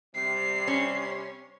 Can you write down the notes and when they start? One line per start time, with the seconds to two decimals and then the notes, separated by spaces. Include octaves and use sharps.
0.15 C3 G3 C7
0.67 C#4